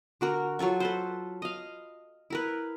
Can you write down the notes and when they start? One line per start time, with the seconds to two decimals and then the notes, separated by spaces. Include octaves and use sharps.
0.21 D3 F#4 A#4
0.59 F#3 F4 A4 C#6
0.80 A4 B4 C5
1.42 D#5 F5
2.30 E4 A#4 B4